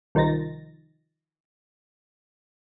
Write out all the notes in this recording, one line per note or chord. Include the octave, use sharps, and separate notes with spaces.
C2 D#3 F3 D#4 A6 A#6